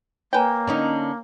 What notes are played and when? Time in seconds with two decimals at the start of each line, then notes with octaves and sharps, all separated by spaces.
0.33 A#3 B4 C#5 G5 G#5 A#5
0.67 D3 C#4 D#4